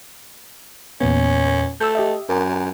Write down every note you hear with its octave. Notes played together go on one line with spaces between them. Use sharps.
E2 A#2 B3 C#4
A3 E6 G6
G4 D#5 E5
F#2 A#4